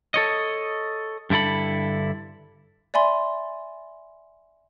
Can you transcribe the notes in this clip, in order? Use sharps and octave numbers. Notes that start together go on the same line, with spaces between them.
A4 C#5 D#5
G2 D3 E4 A4 B5
D5 E5 G#5 B5 C6